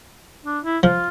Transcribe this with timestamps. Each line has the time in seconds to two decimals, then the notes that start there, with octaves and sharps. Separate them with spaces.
0.46 D4
0.65 E4
0.83 F3 F4